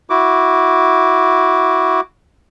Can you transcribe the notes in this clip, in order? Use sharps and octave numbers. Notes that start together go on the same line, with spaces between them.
E4 F#4 D6